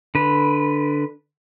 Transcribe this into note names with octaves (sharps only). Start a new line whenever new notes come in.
D3 B4